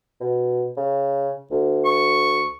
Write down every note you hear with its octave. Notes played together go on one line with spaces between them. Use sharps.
B2
C#3
D2
C#6